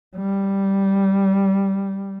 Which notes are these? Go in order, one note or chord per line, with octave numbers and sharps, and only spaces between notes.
G3